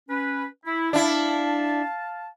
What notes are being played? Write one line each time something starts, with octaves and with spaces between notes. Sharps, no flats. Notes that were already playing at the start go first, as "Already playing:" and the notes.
C#4 B4
E4
D4 E4 F5 A5